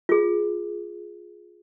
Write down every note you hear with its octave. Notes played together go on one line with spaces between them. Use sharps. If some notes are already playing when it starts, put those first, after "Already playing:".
F4 G#4